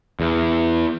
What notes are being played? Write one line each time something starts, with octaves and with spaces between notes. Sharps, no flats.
E2